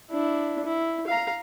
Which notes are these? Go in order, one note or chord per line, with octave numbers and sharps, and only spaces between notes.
D4 E4
E4
F5 A#5